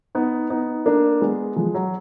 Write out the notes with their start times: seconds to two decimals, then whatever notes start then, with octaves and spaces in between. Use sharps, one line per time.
0.15 B3 D#4
0.50 B3 D#4
0.86 A#3 D4
1.21 G#3 B3
1.56 F3 G#3
1.75 F#3